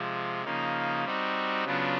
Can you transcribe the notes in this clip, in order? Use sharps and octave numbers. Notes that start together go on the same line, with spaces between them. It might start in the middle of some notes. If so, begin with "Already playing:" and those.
Already playing: C3 F3 G#3
C#3 F3 A#3 D#4
G3 C4 D#4 F#4
C#3 F#3 B3 D4 F4